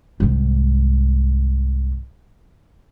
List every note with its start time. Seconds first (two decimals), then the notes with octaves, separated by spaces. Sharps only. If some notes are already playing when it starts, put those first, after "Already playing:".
0.20 C2 G#2